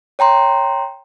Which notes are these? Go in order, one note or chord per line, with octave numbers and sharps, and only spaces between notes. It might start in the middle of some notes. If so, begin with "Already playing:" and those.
C#5 G5 A#5 C6